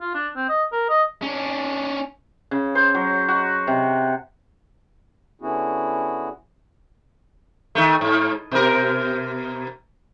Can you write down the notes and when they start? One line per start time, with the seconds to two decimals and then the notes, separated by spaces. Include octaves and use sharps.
0.01 F4
0.14 D4
0.36 C4
0.49 D#5
0.72 A#4
0.89 D#5
1.22 C#4 D4
2.51 C#3
2.75 C5
2.95 F#3
3.28 F#4
3.67 C3
5.41 D3 B3 C#4 E4 F#4 G#4
7.75 D#3 A3
8.01 G#2
8.51 B2 A#4